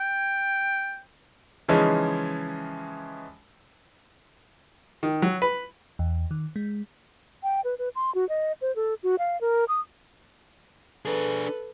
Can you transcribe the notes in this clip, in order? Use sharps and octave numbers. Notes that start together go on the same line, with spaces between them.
G5
C#3 E3 F3 G#3 C#4 D#4
D#3
F#3
B4
E2
D#3
G#3
G5
B4
B4
C6
F#4
D#5
C5
A4
F#4
F5
A#4
D#6
D4 G#4 A4 B4